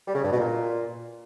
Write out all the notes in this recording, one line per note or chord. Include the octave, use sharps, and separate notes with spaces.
G3
C#3
G2
B2
A#2